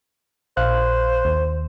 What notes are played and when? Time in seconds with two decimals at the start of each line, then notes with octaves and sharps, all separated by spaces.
0.57 A#1 C5 F5 F#6
1.25 D#2